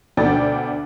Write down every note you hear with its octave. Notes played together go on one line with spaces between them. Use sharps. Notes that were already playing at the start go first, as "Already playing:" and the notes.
D2 B2 D3 D5 G5 A6